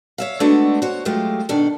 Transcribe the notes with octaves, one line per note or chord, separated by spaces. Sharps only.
C#5 E5 F5
G#3 A3 B3 D4 F#4 A4
F#4 C5 C#5
F#3 G#3 A3 F4 G4
B2 D#3 D4 A4